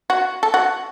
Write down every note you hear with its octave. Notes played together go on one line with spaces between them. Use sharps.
F#4
A4
F#4